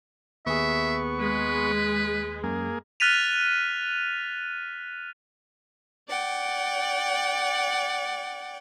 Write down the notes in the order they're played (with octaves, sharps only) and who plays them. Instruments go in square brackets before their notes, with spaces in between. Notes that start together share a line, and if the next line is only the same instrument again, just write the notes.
[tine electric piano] D#2 G#4 [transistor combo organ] B3 C#6 [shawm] E5
[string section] G#3 [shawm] B4
[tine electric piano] F#2 [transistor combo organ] A#3 G#4
[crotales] F6 F#6 A6 B6 D#7 F7
[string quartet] D5 F#5 G5